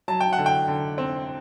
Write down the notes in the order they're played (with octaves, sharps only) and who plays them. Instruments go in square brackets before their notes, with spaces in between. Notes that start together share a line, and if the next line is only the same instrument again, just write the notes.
[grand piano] F#3 A5
G5
F#5
D3
G5
D3
C4